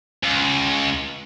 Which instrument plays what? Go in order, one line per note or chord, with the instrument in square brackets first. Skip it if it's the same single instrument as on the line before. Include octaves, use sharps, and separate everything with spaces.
[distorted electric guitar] C#2